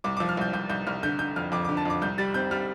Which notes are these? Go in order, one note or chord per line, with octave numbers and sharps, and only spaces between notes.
C2 D6
F3 D6
F6
C2 G6
C2 G6
C2 G6
C2 F6
D3 G6
D3 G6
F2 F6
F2 D6
D3 D6
A5
F2 D6
C2 G6
G3 A6
C4 G6
G3 F6